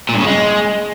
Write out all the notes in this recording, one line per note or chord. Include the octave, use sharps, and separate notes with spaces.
A#2
G2
C#3
G#3